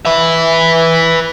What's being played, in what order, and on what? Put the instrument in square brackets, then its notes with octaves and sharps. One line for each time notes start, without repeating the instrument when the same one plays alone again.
[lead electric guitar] B4 E5